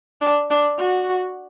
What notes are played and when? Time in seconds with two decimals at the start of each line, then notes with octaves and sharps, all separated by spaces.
0.21 D4
0.50 D4
0.79 F#4